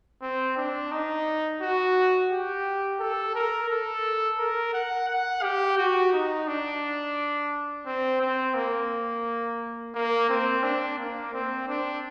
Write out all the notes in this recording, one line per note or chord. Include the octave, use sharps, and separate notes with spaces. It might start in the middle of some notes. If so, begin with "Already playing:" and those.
C4
D4
D#4
F#4
G4
A4
A#4
A4
A#4
F#5
F#5
G4
F#4
D#4
D4
C4
C4
A#3
A#3
C4
D4
A#3
C4
D4